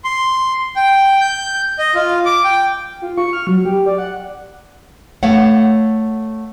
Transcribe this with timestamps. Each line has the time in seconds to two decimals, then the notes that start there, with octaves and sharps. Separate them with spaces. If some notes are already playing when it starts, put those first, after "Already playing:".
0.04 C6
0.76 G5
1.21 G6
1.79 D#5
1.95 F4
2.25 D6
2.44 G5
3.02 F4
3.18 C#6
3.33 F6
3.47 F#3
3.65 G4
3.86 D5
3.98 F#5
5.23 A3 C#5 F5 F#5